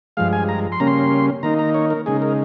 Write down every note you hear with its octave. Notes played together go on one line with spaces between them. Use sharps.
G2 F3 G#3 F5
G#5
A#5
C6
C#3 G3 A#3 C#4 A#5
C6
D#3 A#3 D#4 A#5
A#5
C#5
A#4
C#3 G#3 D#4 G#4
A#4